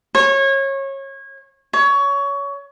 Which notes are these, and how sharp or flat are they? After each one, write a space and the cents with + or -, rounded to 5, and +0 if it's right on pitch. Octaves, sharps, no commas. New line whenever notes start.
C#5 -25
C#5 +20